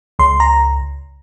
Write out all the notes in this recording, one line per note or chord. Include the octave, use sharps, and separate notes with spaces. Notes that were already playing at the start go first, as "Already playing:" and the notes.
C#2 C6
A#5